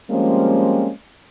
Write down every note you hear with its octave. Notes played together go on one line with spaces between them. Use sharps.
F3 G3 G#3 A#3 C4 C#4